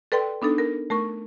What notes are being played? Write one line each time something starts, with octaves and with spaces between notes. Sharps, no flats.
A4 B4 D5 G5 C6
B3 D4 D#4 A4
A#4
A3 A#4 C#6